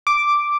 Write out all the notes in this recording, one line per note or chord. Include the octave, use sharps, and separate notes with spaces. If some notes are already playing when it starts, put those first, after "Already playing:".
D6